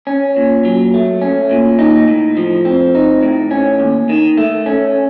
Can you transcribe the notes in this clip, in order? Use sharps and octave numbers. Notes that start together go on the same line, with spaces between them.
C#4
A#2
F#3
A3
C#4
A#2
D#4
A2
F3
C4
D#4
A2
C#4
D#2
D#3
A3
C#4